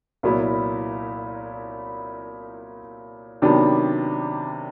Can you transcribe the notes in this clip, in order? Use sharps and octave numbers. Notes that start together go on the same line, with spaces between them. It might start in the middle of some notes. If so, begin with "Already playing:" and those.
C2 A#2 F#3 B3 E4
C3 D#3 F#3 B3 D4